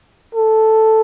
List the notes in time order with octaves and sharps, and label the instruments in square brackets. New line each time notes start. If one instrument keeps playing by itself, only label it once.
[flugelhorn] A4